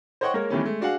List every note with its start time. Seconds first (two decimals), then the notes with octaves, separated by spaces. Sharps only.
0.21 C5 C#5 D#5 F#5 G5 C#6
0.34 G#3 A#3 A#4 C#5
0.50 D#3 E3 G3 A3 B3 C#4
0.64 G#3 A3
0.81 D4 F#4 G#4 F5 F#5